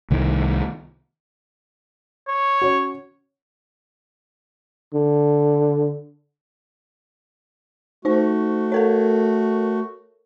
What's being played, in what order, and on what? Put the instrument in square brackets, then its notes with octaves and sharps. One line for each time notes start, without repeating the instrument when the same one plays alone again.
[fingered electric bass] C2 D#3 G3
[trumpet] C#5
[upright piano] C#4 F#4
[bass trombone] D3
[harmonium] A3 F#4 [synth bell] D#4 C5
[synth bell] A4 A#4 C#5